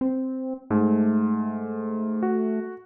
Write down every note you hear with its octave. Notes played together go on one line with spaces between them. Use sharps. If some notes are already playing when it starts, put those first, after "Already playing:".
C4
G#2 A3
F#4